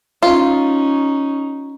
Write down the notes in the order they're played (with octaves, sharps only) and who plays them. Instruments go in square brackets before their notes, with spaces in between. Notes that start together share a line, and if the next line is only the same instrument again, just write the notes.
[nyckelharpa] C#4 D#4 [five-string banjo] F4